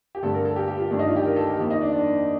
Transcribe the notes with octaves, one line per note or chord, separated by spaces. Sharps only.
G4
G2 D3 A3 A4
A#4
A4
G4
G4
F4
G2 D#3 A3 D4
D#4
F4
G4
A#4
A4
G4
F2 D#3 A#3
D#4
D4
D4